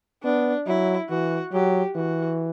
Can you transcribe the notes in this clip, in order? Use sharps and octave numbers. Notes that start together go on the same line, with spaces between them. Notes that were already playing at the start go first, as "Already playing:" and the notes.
B3 D4
F#3 E4
E3 F#4
F#3 G4
E3 F#4